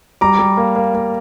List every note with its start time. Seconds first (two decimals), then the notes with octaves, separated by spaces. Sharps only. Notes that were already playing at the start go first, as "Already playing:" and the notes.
0.21 G3 A#5 D6
0.39 G3
0.57 A#3
0.76 A#3
0.94 A#3